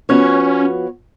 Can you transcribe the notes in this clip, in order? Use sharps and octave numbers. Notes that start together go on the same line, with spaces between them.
F3 B3 C#4 F#4 C#5